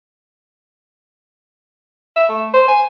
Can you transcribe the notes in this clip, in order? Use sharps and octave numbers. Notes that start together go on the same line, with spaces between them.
E5
A3
C5
G#5